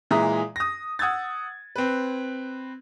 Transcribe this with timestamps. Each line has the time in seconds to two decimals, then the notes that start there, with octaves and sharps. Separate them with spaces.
0.11 A#2 E3 G#3 E5 A#5 D#6
0.56 D#6 A#6
0.99 F#5 D#6 E6 G#6 A6
1.76 C4 B4